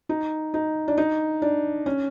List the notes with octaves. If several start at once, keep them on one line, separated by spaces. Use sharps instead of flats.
D#4
D#4
D4
D#4
D4
C#4